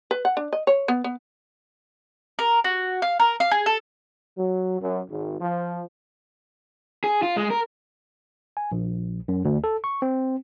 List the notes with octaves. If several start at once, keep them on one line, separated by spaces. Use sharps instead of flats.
B4
F#5
D4
D#5
C#5
B3
B3
A#4
F#4
F5
A#4
F5
G#4
A4
F#3
F#2
G#1
F3
G#4
F4
G#3
A#4
G#5
A#1
F#2
D2
A4
C#6
C4